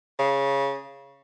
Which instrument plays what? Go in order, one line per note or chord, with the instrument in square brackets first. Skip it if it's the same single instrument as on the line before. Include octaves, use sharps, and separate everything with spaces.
[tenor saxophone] C#3